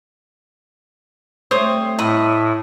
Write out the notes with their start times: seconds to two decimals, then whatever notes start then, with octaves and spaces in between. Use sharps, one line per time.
1.51 G3 A3 C4 C5 C#5 D#6
1.99 A2 E4 D#5 B5